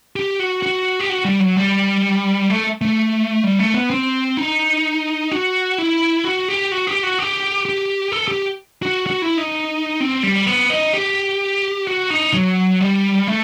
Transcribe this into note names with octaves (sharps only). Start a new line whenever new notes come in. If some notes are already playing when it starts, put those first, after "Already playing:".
G4
F#4
F#4
G4
F#4
G3
F#3
G3
A3
A3
G3
A3
B3
C4
D#4
F#4
E4
F#4
G4
F#4
G4
F#4
G4
G4
A4
G4
F#4
F#4
E4
D#4
C4
G3
B3
D#4
G4
F#4
D#4
F#3
G3
A3